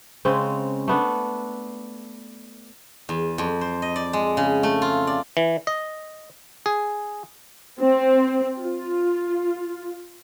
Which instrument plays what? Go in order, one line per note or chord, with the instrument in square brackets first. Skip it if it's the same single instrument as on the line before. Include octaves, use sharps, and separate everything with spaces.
[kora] C#3 G#3 C4 C#4
A3 B3 D4
[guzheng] E2
F2
C5
D#5
D5
G#3
C#3
A3
F4
D5
[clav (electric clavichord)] E3
D#5
G#4
[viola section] C4
F4